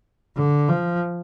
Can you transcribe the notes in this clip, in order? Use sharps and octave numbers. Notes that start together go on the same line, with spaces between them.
D3
F3